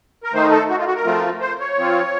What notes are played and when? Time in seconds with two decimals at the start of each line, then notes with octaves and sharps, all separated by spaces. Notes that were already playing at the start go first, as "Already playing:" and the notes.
0.24 A#4
0.33 D#3 A3 D#4 C5
0.51 A4
0.70 F#4
0.78 F4
0.87 F#4
0.96 A#4
1.05 F3 A3 C4 F4
1.41 C5
1.60 C#5
1.77 F3 C4 F4